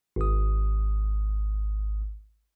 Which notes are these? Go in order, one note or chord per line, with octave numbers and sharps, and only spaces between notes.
G#1 D#6